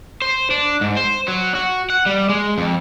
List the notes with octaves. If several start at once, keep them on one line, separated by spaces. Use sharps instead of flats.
C5
D4
G#2
C5
F#3
F#4
F#5
G3
G#3
F2